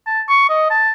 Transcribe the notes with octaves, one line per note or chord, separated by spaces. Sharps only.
A5
C#6
D#5
A5